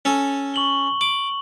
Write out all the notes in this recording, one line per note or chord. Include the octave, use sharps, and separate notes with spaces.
C#4 A4
C#6 F#7 G7
D6 F#7